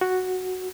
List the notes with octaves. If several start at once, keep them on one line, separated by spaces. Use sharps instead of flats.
F#4